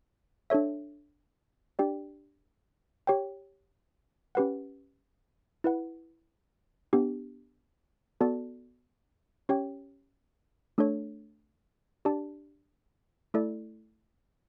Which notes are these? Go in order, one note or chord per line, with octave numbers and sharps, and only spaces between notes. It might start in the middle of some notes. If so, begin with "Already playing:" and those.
D4 A4 C#5 E5
D4 G4 D5 G5
G4 C#5 G5
C#4 G4 B4 F#5
E4 B4 F#5
B3 D4 G4
B3 F#4 A4 D5 A5
C#4 G4 C#5 G5
A3 D4 A4 C#5
D4 G4 D5 A5
A3 E4 A4 D5